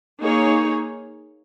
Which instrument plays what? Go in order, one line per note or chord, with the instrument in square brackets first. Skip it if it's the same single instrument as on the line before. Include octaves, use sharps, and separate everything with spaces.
[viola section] A#3 D#4 G#4 C#5